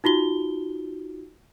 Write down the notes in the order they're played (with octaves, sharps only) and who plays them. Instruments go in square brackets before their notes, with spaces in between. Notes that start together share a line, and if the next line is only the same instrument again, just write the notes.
[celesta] D#4 F4 F#4 G7